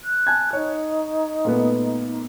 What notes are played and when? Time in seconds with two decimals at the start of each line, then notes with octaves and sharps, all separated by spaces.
0.03 F#6
0.27 G#5 A5 G#6
0.53 D#4 C#5
1.45 A#2 A3 B3